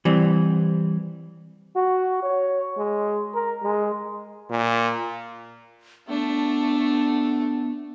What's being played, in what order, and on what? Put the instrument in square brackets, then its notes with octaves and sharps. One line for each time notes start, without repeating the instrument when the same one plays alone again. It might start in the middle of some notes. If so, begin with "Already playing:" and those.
[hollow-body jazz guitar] E3 G3 C4
[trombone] F#4
C#5
G#3
A#4
G#3
A#2
[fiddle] A3 D4 [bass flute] B3